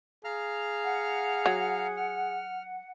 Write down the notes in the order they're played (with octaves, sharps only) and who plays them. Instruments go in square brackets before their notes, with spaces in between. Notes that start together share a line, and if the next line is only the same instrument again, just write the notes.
[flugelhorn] G#4 [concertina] F5 A#5 F6
[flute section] F#5
[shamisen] F#3
[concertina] F6